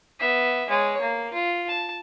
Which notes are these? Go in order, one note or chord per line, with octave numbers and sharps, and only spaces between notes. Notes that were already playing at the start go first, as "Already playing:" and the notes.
B3 E5
G#3 C#5
A#3
F4
A5